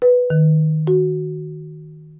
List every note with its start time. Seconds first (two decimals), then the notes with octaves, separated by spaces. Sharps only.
0.02 B4
0.30 D#3
0.87 F#4